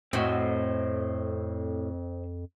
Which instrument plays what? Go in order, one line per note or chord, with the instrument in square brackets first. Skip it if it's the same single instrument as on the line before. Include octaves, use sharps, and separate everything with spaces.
[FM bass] F2 [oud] A2 F#4 [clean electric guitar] C4 C5 D#5